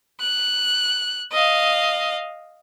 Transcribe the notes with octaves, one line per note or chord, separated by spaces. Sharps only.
F#6
D#5 F5